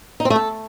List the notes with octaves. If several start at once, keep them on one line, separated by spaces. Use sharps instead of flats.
D#4
C4
A3
A4